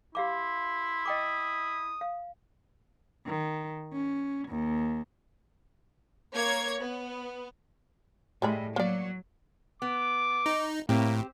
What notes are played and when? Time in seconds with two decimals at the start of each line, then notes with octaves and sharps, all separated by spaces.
0.15 E4 G4 F5 C6 D6
1.06 D#5 G5 D6 D#6
2.01 F5
3.27 D#3
3.93 C#4
4.48 D#2
6.33 A#3 C#5 G#6
6.80 B3
8.42 A2 G3 G#3 B5
8.76 F#3 A#3 D5
9.82 B3 D6
10.46 D#4
10.89 A2 A#3 C4 G4